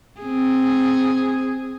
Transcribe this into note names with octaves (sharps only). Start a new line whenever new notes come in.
C4 G#4